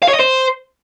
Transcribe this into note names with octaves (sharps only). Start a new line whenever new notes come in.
F5
C#5
D#5
C5